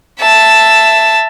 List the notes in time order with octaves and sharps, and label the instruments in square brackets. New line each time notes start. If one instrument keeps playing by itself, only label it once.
[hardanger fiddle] E5 A5